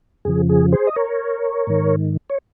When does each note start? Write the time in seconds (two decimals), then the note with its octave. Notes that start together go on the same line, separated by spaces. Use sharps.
0.25 F2 C#3 F3 G#4
0.49 G#4
0.72 G#4 C5
0.87 D#5
0.96 A#4 C#5
1.67 G#2 D#3
2.30 C#5